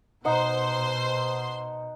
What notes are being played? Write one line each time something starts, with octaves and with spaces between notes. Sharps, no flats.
B2 D#4 C5 F#5 C6